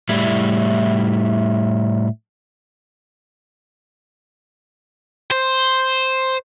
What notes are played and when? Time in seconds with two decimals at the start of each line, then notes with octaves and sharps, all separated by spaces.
0.09 A2 G3 E4
5.31 C5